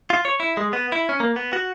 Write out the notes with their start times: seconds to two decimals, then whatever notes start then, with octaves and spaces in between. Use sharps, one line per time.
0.10 F4
0.25 C#5
0.40 E4
0.57 G#3
0.73 B3
0.92 E4
1.09 C#4
1.20 A#3
1.36 B3
1.53 F#4